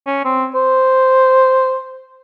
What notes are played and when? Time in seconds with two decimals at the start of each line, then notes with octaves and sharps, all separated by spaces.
0.07 C#4
0.25 C4
0.55 C5